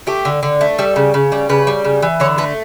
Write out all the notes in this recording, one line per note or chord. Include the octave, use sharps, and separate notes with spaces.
A3 G4
D3
D3
A3
G3 A4
C#3
C#3
G3
C#3 B4
G3
C#3
E3
D3 C#5
A3 B4